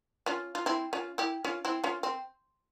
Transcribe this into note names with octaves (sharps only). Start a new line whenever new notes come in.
C#4 F4
F4
C4 E4
C#4 F4
E4 G4
C#4 F4
C4 E4
C#4 F4
C4